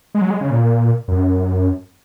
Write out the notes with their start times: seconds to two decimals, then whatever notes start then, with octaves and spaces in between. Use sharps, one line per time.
0.15 G#3
0.21 F#3
0.30 G#3
0.41 C#3
0.50 A#2
1.08 F#2